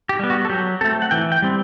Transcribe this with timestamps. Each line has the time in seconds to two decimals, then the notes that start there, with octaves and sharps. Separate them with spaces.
0.09 G4
0.19 G3 B3
0.30 F#4
0.45 A4
0.50 F#3 G4
0.81 A3 C4 A4
1.02 F#5
1.11 E3 G5
1.32 G5
1.42 G3 C4